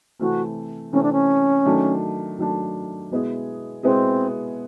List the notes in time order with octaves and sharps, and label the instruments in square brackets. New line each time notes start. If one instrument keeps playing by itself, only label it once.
[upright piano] C3 E3 A3 C4 [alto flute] F#4
[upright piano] C3 E3 A3 C4 [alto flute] C#4
[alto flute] D4
C#4
[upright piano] D#3 F#3 A3 D4
D#3 F#3 A3 D4
B2 G#3 B3 E4 G#4
[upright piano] B2 G#3 B3 E4 G#4 [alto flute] C4